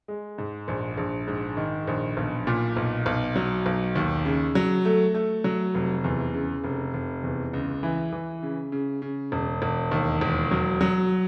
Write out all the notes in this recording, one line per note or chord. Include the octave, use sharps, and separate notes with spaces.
G#3
G#2
A#1
A#1
G#2
D#3
A#1
B1
A#2
B1
B1
F#3
B1
D#2
C#3
F#3
A3
A3
F#3
F1
E2
C#3
F1
F1
E2
C#2
E3
E3
C#3
C#3
C#3
E1
E1
D#2
E1
F#3
F#3